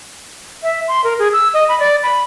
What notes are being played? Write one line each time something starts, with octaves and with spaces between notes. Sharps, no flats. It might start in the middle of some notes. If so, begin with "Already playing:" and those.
E5
C6
A#4
G#4
E6
D#5
B5
D5
B5